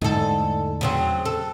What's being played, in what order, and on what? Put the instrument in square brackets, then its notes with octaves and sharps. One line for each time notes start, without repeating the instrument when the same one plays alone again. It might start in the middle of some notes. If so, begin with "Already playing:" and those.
[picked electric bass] E2 D3 A3 [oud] G#2 A4
[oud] C#3 F#3 C4
A4